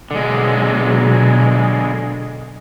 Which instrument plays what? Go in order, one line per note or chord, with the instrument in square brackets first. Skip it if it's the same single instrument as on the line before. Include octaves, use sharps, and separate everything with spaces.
[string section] B2 F#3 [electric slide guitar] D3 G#3